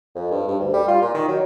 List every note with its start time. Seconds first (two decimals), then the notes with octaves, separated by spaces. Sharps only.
0.15 F2
0.31 G2
0.48 G2
0.60 D2
0.74 G3
0.88 F4
1.02 A#2
1.14 D#3
1.28 F#3